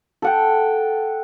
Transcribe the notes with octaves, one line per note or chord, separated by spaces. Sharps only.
A4 F#5 G5